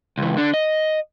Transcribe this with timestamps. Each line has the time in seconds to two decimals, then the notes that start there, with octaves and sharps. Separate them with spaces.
0.18 C#2 E3
0.37 D3 D4
0.54 D#5